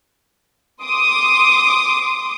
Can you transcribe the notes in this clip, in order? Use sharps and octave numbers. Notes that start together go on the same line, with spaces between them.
C6 D6 D#6